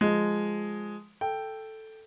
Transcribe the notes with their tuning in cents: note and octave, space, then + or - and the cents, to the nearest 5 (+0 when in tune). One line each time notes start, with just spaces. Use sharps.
F3 +5 G#3 +0
A4 +0 G5 +0